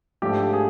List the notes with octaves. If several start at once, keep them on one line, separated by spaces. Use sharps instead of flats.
G#2 F3 A3 D4 G4
G#4